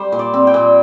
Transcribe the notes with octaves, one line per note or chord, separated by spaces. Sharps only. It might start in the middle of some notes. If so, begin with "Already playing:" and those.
Already playing: G3 C5
A#2
D5
C4
G5
A#2